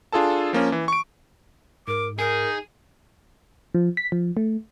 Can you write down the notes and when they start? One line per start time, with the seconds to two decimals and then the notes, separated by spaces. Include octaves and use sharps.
0.12 D4 F4 G#4 A4 A5
0.53 F3 A#3 C#4
0.72 E3
0.88 C#6 D7
1.88 G#2 A#4 D6
2.19 D#4 G#4 A#4
3.74 F3
3.97 B6
4.12 F3
4.37 A3